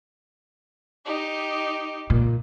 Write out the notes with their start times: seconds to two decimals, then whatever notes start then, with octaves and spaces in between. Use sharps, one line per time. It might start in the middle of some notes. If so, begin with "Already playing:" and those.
1.04 D#4 G4
2.10 A#2